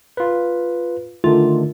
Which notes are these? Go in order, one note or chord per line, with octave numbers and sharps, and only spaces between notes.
F4 B4
D3 D#3 A3 F4